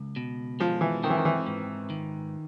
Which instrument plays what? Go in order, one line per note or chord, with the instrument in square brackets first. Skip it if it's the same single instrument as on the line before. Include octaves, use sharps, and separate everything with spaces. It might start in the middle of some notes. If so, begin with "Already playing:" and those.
Already playing: [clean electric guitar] C#2
B2
[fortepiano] F3 [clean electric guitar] G#3
[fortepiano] E3
[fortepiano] D#3 [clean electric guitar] C4
[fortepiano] E3
D#3
E3
[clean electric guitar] G#2
D#3